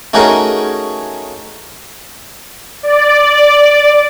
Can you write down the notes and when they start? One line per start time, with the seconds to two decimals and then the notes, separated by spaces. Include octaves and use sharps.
0.14 A3 C#4 D#4 F#4 G#4 A#4
2.83 D5